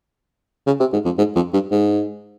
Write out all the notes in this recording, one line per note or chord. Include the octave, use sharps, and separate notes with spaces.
C#3
C3
G#2
F2
G#2
F2
G2
G#2